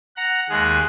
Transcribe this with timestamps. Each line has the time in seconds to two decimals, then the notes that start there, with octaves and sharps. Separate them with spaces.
0.17 F#5 A#5
0.50 D#2 G#3 G#4 F#6